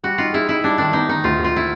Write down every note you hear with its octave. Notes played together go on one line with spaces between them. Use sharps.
G3 F#4
D#4 F4
E4 G#4
D#4 E4
G3 D4
D#3 D4
B3 D#4
D#3 D#4
D2 F4
D2
F4
E4